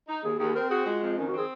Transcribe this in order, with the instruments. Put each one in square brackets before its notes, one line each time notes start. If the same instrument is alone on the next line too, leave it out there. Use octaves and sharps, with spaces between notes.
[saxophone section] D#4
[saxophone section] D#2 [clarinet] G#4
[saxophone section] D#2 [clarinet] G#4
[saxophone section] C4 [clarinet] A#4
[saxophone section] F#4 [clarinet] G#4
[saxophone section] G#3 [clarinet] F4
[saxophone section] F2
[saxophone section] D#3 [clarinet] C#4
[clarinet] F#4
[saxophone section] C4 [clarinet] G#4